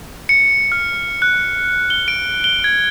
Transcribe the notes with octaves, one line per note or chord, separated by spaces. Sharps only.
C#7
F6
F#6
G7
D7
G7
G#6